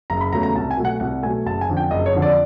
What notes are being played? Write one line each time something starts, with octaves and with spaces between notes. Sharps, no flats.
F#1 A#5
B5
E2 C#3 F#3 A3 A#5
A#5
C2 A5
G#5
B2 F#3 A3
F#5
C2 F#5
B2 F#3 A3 G#5
F#1 A5
G#5
F2 D3
G5
F#1 D#5
C#5
F2 D3
D5